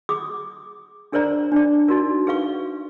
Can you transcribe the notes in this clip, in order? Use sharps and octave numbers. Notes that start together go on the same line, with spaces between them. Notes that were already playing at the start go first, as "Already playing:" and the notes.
G#4 D6 D#6
D4 G#4 A#4 C5 D5 A#5
D4 D5
D#4 F#4 A#4
G#4 B4 F5 C#6